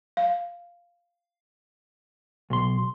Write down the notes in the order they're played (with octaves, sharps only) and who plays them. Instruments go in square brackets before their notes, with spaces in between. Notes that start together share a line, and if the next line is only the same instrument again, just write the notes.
[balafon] F5
[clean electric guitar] B1 C6